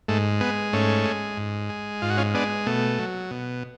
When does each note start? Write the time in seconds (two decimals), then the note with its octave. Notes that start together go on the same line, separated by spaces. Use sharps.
0.08 G#2 A3
0.41 G#3 B3
0.73 G#2 A3 C#4
1.05 G#3
1.37 G#2
1.70 G#3
2.02 G#2 F4
2.10 F#4
2.17 C#4 F4
2.34 G#3 B3 D4
2.66 B2 A3
2.99 F#3
3.31 B2